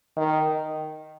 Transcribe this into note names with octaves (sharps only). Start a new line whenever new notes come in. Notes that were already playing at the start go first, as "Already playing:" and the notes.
D#3